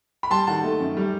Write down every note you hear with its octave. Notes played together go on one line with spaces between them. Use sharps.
B5
G3 A5 C6
D#3 F#5 A5
A3
F#2
G3